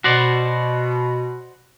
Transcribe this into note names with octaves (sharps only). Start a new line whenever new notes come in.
B2 F#4 C5 D5